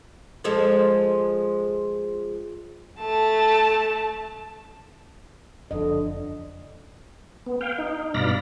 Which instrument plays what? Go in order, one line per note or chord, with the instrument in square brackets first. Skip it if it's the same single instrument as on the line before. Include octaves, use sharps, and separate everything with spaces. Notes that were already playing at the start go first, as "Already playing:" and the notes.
[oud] F3 G#3 A4
[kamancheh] A3 A5
[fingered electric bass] F#1 F2 [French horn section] D3 [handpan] D#5
[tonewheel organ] B3
F5 G5
D#4
G2 B2 D5 F5 B5 A#6